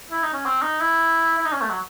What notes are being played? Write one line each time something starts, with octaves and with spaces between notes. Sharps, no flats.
E4
D#4
C#4
C4
D#4
E4
E4
D#4
C#4
A3
F#3